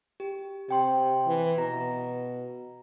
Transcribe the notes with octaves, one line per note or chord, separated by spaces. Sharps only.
G4
C3 G4 G5 C6
E3
B2 A#5